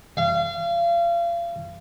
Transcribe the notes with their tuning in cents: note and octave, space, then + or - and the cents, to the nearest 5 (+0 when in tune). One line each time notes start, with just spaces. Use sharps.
F5 -35